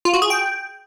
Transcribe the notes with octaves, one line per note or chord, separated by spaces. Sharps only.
F4
F#4
G#4
G5